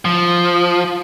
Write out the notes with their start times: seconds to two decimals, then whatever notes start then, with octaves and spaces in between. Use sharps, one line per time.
0.05 F3